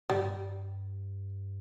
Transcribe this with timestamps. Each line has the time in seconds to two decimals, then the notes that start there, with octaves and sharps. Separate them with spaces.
0.10 G2 G3